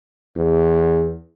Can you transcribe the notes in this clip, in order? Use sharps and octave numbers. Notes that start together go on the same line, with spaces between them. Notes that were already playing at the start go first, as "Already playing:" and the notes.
E2